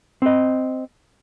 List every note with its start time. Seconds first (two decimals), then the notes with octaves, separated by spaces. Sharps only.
0.22 C4 D#5